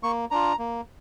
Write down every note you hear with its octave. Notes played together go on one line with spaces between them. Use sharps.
A#3 C#6
D4 F4 A#5
A#3